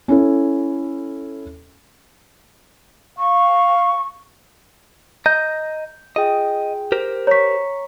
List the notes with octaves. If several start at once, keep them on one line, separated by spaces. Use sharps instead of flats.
C#4 E4 A4
F5 C#6
D#5 A#5 G6
F4 G#4 D#5 G5
G4 A#4 C5
C#5 A#5 C#6 B6